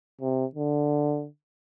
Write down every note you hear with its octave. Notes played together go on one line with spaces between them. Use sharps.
C3
D3